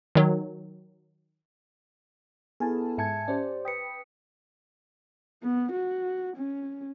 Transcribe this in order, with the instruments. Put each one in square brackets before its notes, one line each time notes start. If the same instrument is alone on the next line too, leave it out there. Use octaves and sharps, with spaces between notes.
[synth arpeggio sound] D#3 F#3
[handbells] B3 E4 A4 [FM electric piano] G#4 G#5 A5
[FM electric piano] G#2 G#5 C#7 [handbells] E5 A5 G#6
[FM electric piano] C#4 [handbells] G4 C5 D5
[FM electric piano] B4 G5 [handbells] D#6 B6 C#7
[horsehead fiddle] B3
F#4
C#4